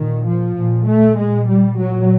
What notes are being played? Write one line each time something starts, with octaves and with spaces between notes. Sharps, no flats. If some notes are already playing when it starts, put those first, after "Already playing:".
Already playing: A#2 D#3
F3
A#2
A3
A#2 G#3
G3
A#2 F#3